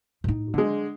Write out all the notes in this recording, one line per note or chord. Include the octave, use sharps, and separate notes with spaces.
A2 D#4
D3 F#3 G#3